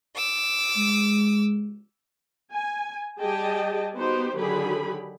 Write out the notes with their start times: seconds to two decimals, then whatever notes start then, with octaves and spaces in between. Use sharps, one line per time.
0.17 D6 E6
0.77 G#3
2.52 G#5
3.20 G3 G4 G#4 D#5 G5 A5
3.95 B3 D#4 F#4 G4 C5
4.36 D3 D#3 F#3 G4 G#4 B5